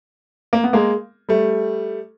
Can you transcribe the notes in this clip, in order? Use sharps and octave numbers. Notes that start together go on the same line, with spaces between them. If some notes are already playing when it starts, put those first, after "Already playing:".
A#3
B3
G#3 A#3
G3 A3